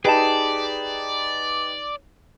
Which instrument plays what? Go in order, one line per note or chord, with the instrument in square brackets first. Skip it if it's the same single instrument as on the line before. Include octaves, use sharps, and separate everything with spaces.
[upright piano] D#4 G4 B4 [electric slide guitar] G#4 A5 [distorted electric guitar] D5